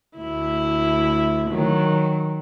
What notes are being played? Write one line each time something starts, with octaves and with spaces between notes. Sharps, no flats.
D2 E4
D#3 F#3